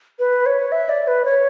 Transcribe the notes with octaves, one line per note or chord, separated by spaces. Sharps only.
B4
C#5
E5
D5
B4
C#5